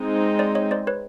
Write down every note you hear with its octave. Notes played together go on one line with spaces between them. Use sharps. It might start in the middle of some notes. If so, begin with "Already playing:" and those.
Already playing: G#3 C4 D#4
C5 D5
C#5 D#5
C5 D5
B4 C#5